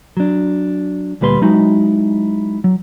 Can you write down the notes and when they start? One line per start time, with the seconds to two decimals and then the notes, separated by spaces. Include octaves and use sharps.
0.17 F#3 D4
1.21 D2 A#2 G3 B4 B5 C6
1.41 F#3 G#3 D#4 E4 F#4
2.64 F#3